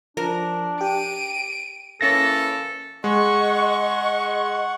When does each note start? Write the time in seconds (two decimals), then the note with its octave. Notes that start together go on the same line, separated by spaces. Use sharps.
0.17 F3 D4 A#4
0.81 G4 D7 D#7
2.01 E3 A#3 C#4 A4 A#6
3.04 G#3 D#5 F#5 C#6